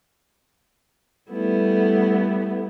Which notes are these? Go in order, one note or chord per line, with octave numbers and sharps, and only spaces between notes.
G3 A3 B3 E4